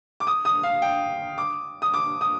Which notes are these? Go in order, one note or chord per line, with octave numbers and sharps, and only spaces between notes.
D6
D#6
D#6
F5
G5
D6
D#6
D6
D#6